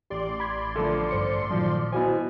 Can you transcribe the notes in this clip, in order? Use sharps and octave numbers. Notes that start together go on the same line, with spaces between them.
A1 G4 D5 C6
B5 G#6
D3 F3 A3
G2 C5 C#7
A#2 D#3 F3 F#3
B2 E4 F#4 C5 G#5